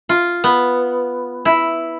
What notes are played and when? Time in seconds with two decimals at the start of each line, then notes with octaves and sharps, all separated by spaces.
0.09 F4
0.44 B3
1.45 E4